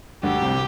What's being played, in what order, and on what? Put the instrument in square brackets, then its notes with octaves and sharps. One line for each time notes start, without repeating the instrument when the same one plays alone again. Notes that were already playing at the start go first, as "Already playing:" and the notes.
[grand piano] D2 D3 [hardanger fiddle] G4
[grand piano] C2 C3